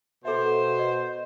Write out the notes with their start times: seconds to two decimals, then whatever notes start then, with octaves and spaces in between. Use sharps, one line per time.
0.25 B2 A4 C5 E5
0.79 D#5